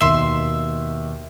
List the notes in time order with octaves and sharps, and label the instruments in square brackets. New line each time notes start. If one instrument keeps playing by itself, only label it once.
[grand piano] D#2 B2 G7 [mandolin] E5 C6